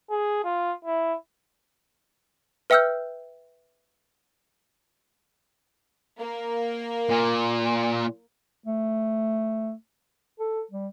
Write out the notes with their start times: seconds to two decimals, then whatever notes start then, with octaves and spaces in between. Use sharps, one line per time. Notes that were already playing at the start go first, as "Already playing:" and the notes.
0.10 G#4
0.44 F4
0.85 E4
2.70 B4 E5 G5 E6 F6 G6
6.18 A#3 A#4
7.10 A#2
8.66 A3
10.40 A4
10.71 G3